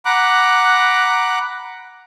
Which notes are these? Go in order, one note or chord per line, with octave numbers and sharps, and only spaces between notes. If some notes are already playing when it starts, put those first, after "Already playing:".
F#5 A#5 B5 D6 F#6